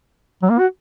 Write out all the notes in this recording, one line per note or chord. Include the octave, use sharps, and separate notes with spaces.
F#3
A#3
F#4